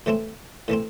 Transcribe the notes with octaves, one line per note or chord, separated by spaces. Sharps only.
A2 E3 A3 C4
A2 E3 A3 C4